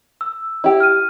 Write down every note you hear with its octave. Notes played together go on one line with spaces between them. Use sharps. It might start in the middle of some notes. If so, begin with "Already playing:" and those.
E6
E4 G4
F6 D#7